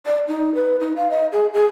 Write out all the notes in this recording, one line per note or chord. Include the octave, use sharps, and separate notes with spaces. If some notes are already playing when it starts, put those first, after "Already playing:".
D5
D#4
B4
D#4
F5
D#5
G#4
G#4